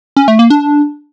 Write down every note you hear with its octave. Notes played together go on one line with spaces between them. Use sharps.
C#4
A3
A#3
D4